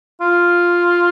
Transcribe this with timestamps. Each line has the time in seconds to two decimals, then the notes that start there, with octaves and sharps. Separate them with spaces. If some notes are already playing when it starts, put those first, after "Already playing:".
0.21 F4